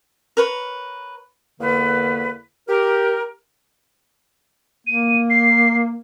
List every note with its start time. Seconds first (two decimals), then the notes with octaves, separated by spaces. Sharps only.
0.37 A#4 B4 C#5
1.60 E2 D3 A#3 A#4 B4
2.68 G4 A#4
4.87 A#3 D#7
5.30 C7